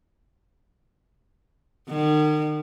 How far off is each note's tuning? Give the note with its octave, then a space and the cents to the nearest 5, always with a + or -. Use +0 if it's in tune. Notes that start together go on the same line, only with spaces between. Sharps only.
D#3 -40